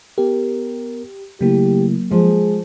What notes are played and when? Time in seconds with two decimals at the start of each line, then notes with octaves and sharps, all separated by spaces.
0.18 B3 G4 A#4
1.41 C#3 F#3 A3 A#3 E4 G4
2.11 F3 G#3 G#4